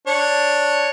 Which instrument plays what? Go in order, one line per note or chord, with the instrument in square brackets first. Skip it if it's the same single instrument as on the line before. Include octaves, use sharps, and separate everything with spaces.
[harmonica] D4 C#5